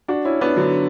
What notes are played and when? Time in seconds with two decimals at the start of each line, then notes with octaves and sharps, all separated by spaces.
0.08 D4 F#4
0.25 C#4 E4
0.41 B3 D4
0.56 D3 F#3